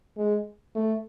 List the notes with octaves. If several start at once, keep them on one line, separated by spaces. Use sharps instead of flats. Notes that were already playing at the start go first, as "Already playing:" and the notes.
G#3
A3